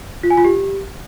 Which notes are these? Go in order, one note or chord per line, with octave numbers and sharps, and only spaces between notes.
F4
G#5
F4
G4